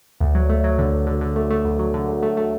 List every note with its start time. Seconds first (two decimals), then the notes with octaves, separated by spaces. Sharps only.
0.21 D2
0.35 F#3
0.49 A3
0.64 F#3
0.78 D3
0.93 D2
1.07 D3
1.21 D3
1.36 A3
1.50 A3
1.65 D2
1.79 F#3
1.94 D3
2.08 D2
2.23 A3
2.37 A3